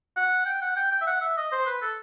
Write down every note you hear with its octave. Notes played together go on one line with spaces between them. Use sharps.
F#5
G5
F#5
G5
G5
E5
F#5
E5
D#5
C5
B4
A4